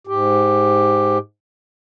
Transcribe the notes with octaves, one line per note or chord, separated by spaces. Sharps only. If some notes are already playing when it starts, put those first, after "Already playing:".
G#2 G4